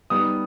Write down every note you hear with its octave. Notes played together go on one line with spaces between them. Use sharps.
G3 B3 D#4 D#6